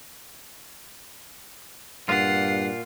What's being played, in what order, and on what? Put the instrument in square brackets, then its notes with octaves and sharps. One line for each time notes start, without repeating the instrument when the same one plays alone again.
[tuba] G2 [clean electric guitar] A#2 F4 [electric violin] F#5 C7